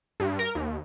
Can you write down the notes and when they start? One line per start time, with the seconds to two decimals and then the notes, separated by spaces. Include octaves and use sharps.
0.20 G2
0.39 A#4
0.55 D#2